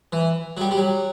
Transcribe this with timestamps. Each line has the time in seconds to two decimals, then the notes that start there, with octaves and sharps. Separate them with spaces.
0.12 E3
0.57 F#3
0.61 G3
0.71 G3
0.77 F#3